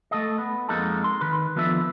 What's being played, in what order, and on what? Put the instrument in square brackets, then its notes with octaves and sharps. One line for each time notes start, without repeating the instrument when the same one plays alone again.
[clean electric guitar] A3 A4 D#5
B3
F2 G#3 A#3 D#4 A4
C6
D#3 B4
D#3 F3 B3 D4 A4 E5